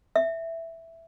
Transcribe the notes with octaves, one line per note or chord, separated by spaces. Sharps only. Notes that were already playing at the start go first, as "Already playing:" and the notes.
E5